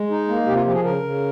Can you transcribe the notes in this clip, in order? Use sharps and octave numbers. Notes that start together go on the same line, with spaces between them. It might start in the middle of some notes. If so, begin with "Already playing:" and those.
Already playing: G#3
D#4
A#3
C3 G4
F4
F3 G4
G#4
C#3 A#4
C#3